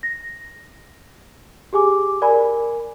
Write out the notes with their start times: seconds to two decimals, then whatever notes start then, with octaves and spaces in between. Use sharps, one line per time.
0.03 A#6
1.73 G4 G#4 G#5 D6
2.22 A#4 D5 G#5 B5